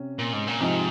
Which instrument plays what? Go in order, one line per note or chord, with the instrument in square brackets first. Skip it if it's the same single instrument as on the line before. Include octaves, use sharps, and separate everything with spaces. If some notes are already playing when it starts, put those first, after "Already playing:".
Already playing: [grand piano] C3 C#4
[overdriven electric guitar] A#2
G#2
A#2
[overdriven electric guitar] G#2 [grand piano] C3 F3 C4 D#4